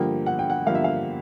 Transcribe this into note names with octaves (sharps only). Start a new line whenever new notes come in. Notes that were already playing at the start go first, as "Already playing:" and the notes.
Already playing: G2 D3 F3 A#3 G5
F#5
G5
F#5
G2 D3 F3 A#3 F5
E5
F5